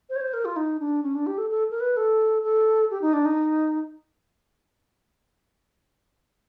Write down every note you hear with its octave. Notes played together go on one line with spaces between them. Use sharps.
C5
C#5
C5
A#4
F4
D#4
D4
C#4
D4
G4
A4
A4
A#4
B4
A4
A4
G4
D#4
D4
D#4